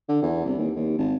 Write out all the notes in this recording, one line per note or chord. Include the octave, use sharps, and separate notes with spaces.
D3
E2
C2
D#2
D#2
G#1